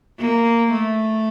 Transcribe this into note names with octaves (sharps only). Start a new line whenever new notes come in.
A#3
A3